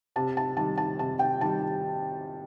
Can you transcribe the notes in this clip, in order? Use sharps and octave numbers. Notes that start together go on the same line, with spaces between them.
C3 A5
A5
D#3 G3 A5
A5
C3 A5
G5
D#3 G3 A5